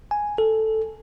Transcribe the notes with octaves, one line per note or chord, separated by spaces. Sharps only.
G#5
A4